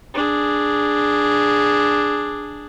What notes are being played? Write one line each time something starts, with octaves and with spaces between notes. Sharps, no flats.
D4 G#4